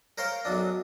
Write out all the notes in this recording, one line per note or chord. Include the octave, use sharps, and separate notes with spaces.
A#4 C5 C#5 F5 G5
B1 F#2 F#3 D4